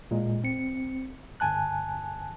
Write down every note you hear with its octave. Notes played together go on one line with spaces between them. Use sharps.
A#2 G#3
C4 C#7
G1 G#5 A5 F#6